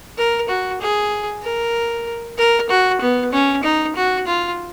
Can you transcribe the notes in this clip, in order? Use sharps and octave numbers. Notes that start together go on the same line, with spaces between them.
A#4
F#4
G#4
A#4
A#4
F#4
B3
C#4
D#4
F#4
F4